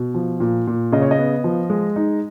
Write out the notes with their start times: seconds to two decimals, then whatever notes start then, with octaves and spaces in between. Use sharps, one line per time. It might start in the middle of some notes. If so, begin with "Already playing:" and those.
Already playing: B2
0.14 F3
0.40 A#2
0.67 A#2
0.92 C#3 D#5
1.02 C#5
1.11 D#5
1.19 B3
1.44 F3
1.70 G#3
1.96 D#4